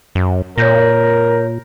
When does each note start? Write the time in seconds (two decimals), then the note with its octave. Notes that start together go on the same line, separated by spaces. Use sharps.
0.15 F#2
0.58 A#2 A#4 C#5 G6 A#6